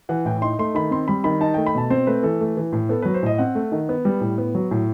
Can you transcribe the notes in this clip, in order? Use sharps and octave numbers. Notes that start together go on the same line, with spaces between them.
E3 F#5
A2 G5
D#4 C6
A3 C6
D#3 B5
C4 C6
G3 B5
D#3 B5
D#4 A5
A3 G5
B5
B2 A5
C4 C5
A3 B4
E3 A4
A3
E3
A2
B3 A4
F#3 B4
C5
A2 D#5
C4 F#5
A3
D#3
B3
G3
A2
B3
F#3
A2